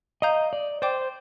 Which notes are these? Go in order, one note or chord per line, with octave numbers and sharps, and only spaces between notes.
D#5 F5 A#5 D#6 G6
D5
C5 D5 G5 D6